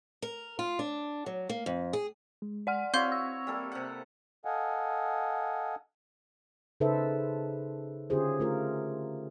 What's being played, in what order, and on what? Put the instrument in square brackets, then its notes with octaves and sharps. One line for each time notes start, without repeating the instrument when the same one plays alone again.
[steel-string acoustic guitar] A#4
F4
D4
F#3
A#3
F2
G#4
[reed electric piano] G#3
[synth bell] D5 F#5 F6
[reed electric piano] C4 [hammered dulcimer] E4 F#4 C#5 [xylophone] F5 C6 G6
[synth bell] E6
[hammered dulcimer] G3 A#3 A4
C3 F#5
[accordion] A4 D#5 F5 F#5 G#5
[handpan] C#3 D#4 A4 B4 C5 E5
D3 C#4 F4 G4 G#4 C5
A3 F4 A#4